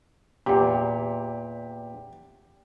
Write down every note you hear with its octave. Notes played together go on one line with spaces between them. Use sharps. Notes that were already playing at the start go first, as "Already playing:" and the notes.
E2 A#2 G4